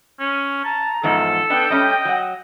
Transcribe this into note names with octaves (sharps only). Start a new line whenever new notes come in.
C#4
A5 A#5
E2 G#2 F3 A4
B3 D4 G5
G3 A3 C#4 D#5
F#3 F#5